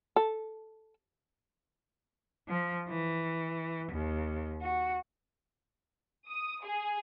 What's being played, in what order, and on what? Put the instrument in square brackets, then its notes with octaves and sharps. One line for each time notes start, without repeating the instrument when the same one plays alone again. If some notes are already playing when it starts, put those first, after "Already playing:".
[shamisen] A4
[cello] F3
E3
D#2
F#4
[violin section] D#6
G#4